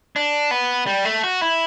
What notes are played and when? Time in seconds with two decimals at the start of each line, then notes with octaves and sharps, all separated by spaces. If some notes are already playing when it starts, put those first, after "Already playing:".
0.16 D4
0.51 B3
0.87 G3
1.05 A3
1.23 F#4
1.41 E4